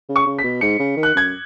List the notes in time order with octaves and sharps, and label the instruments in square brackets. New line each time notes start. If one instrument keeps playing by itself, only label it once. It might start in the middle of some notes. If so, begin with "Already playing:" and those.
[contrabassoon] C#3
[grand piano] C#6
[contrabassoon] C#3
[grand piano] B6
[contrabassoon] B2
[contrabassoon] G#2 [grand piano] C#7
[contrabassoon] C#3
D#3
[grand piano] F#6
[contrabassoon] F#2 [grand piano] G#6